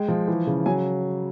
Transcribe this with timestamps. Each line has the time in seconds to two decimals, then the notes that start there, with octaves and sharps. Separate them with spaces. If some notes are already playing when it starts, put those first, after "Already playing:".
Already playing: G#3 G5
0.08 F3
0.28 E3
0.47 C#3
0.66 F#3 G#5